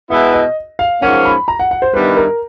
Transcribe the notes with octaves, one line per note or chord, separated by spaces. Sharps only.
B2 G#3 B3 E4 E5
D#5
F5
G#2 F3 A#3 C#4 F#5
B5
A#5
F#5
F#5
C5
G2 D#3 G3 B3 E4 B4
A#4